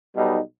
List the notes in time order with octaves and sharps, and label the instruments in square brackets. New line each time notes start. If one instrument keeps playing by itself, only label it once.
[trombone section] B1 B2 G3 D#4